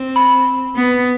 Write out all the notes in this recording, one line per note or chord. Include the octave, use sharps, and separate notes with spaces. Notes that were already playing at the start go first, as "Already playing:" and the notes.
Already playing: C4
B5
B3